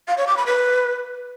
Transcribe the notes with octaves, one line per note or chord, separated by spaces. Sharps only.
F5
C#5
D6
B5
B4